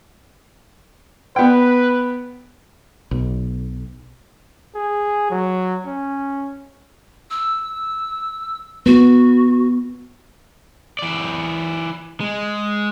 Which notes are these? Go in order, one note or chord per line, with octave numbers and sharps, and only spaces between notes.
B3 B4 G5
B1
G#4
F#3
C#4
E6
B3 F#4
E3 D5
G#3